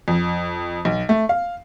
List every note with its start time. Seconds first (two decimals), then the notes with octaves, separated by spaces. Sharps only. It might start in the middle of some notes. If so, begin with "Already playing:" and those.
0.08 F2
0.85 B1
1.09 A3
1.29 F5